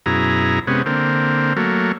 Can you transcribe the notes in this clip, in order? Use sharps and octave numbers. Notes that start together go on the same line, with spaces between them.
F#2 B2 E4 G#4 A#5
C3 G#3 B3 C#4
D3 A#3 C4
F#3 A3 A#3